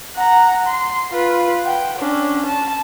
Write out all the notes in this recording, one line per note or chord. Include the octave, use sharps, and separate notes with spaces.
F#5 A#5
C6
F4 B4
F#5 G5
C#4 D4
A5